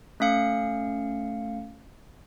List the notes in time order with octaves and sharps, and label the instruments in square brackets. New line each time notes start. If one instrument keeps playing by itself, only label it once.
[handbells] A3 C#4 F5 C#7